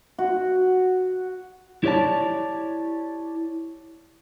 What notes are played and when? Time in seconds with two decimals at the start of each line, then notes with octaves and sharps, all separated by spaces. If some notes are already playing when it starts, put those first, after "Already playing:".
0.18 F#4
1.84 E4 G4 C#5 D5 A5